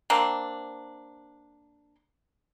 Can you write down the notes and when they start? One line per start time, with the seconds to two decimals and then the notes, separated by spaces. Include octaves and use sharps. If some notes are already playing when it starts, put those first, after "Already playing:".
0.10 A#3 C4 D4